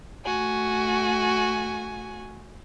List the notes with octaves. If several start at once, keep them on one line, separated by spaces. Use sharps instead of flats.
A3 F#4 G#5